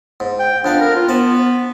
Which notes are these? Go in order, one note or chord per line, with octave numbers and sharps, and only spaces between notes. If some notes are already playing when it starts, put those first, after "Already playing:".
G#2
G5
F2 B3 D4 F5
A#4
F4
B3 C5 A5